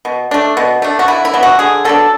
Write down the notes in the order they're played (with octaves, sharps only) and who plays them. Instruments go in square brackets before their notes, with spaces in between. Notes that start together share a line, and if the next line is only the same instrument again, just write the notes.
[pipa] B2
A3 D4
B2
A3 D4
F#4
D3 E4
E4
F#3 B3 D4
F#4
D3 G#4
F#3 B3 D4 A4